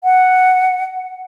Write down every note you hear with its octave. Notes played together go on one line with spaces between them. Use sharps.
F#5